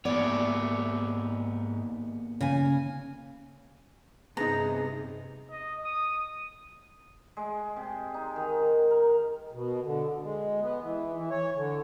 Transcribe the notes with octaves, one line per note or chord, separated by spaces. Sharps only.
D#2 G#2 C#3 B3 C#5 D5
C#3 G#5
G2 C3 B3 C4 D#4 G#4 A#5
D#5
D#6
G#3
C3
D#4
D#3
A#4
B2
D3
G#3
B3
E3
E3
C#5
D3